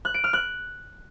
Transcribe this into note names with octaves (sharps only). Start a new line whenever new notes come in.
F#6
D7
F6
F#6